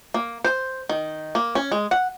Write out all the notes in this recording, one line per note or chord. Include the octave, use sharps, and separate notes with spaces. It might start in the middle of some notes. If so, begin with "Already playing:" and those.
A#3
C5
D#3
A#3
C#4
G#3
F#5